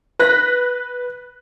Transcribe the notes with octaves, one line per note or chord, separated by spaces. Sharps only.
B4 F#6 A#6 B6